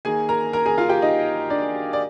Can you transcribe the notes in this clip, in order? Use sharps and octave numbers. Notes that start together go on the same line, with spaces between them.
D#3 A#3 G#4 G#5
A#4 A#5
A#4 A#5
G#4 G#5
F4 F5
G4 G5
D#4 D#5
D4 D5
D5